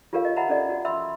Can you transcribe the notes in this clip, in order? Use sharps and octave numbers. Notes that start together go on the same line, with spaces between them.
F4 G4 A4 A#4 C#5 F5
D#5
E5 F#5 G#5 A#5 B5
C#4 A4 D5 D#5
F#4
E5 B5 C6 E6